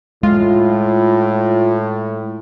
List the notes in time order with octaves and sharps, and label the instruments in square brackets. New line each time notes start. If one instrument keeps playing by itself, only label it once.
[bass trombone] A2 [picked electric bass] G#3 [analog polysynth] F4